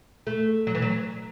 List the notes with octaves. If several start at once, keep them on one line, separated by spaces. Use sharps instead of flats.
A3
F#3
E3
F#3